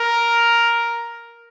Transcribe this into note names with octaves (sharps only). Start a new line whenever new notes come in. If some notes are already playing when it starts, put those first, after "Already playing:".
Already playing: A#4